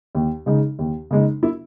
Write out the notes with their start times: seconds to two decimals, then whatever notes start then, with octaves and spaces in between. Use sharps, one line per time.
0.15 D#2
0.46 C#3 G#3 D#4
0.79 D#2
1.11 C#3 G#3 D#4
1.43 E4